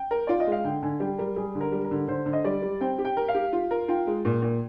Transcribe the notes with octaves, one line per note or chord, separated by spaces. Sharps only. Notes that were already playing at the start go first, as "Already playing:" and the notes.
Already playing: G5
A#4
F4 D5
D#5
G#3 F5
D3 G5
D3 G#5
G3 G5
G3 A#4
G3 G#4
D3
A#4
G3
A#4
D3
D3 C5
D3
D#5
G3 D5
G3
C4 G5
G4
G5
A#4
F5
G4
F4
A#4
F4 G5
G#3
A#2
A#2